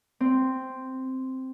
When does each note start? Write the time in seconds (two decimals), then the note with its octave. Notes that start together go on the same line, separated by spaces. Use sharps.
0.20 C4